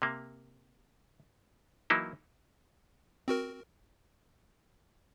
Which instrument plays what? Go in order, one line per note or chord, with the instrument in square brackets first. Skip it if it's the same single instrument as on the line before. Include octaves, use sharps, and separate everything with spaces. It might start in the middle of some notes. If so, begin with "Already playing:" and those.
[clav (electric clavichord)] C3 A#3
E3 F#3 A#3 D#4 E4
[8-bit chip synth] C4 F#4 A#4